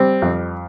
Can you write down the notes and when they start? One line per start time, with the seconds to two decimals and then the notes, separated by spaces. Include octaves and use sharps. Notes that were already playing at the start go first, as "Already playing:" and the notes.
Already playing: G3 C4
0.22 F2